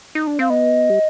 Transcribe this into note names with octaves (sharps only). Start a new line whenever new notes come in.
D#4
D4
C4 F5
B3 D#5
G3